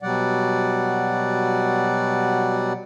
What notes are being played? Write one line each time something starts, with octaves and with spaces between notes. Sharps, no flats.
B2 F#3 G3 D5 F#5